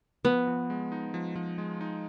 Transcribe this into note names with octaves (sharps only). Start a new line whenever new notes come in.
F3 B3
F3
G#3
D#4
F3
F3
G#3
D#4